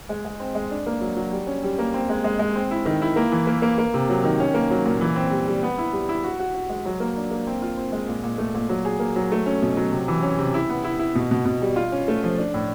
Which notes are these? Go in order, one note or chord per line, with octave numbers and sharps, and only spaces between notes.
G#3
G#3
C4
G#3
D4
A#3
F#3
F#3
G3
C#4
G3
A#3
C4
G#3
G#3
G#3
C4
E4
D#3
E4
A#3
E3
A#3
A#3
A#3
C3
F#3
D#3
C#4
A#3
F#3
A#2
E3
C4
G3
G3
B3
E4
G3
E4
F#4
F#4
F#4
G#3
F#3
A#3
D4
A#3
C4
F4
C4
G#3
A#2
A#2
A3
A#2
F#3
G#4
A#3
F#3
A3
C#4
B2
F#3
C3
E3
C#4
C3
E4
B3
E4
E4
B2
B2
B2
G3
F4
C#4
A3
F3
D4
A2